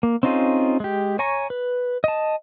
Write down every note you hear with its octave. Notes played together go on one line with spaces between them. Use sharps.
A#3
C4 C#4 D#4 F4 G#4
G#3 G4
C#5 G#5 A#5 C#6
B4
D#5 A5